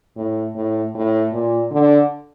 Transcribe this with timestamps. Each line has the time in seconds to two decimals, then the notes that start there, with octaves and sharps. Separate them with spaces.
0.17 A2
0.55 A2
0.95 A2
1.33 A#2
1.71 D3